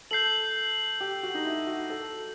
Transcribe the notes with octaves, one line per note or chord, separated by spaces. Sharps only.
A4 G6 C7 F#7
G4
F#4
D#4
E4
F#4
A4